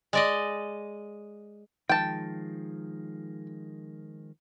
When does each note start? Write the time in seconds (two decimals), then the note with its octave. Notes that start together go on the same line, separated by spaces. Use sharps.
0.13 G#3 D5 D#5
1.89 D#3 F3 G#3 G5 A5